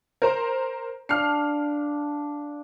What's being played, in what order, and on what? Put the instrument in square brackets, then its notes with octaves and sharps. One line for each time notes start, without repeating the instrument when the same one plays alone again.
[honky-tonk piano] A#4 C5 A#5
[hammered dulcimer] D4 F5 [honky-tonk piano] F6 C7